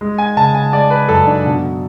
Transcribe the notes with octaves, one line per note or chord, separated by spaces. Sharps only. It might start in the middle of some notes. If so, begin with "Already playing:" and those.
G#3
G#5
C#3 A5
G#5
G#3 D5
B4
F#2 A4
D4
B2